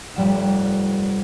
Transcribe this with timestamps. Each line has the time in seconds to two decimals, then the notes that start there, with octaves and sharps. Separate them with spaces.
0.15 F1 G2 G3 A#4 F#5 E7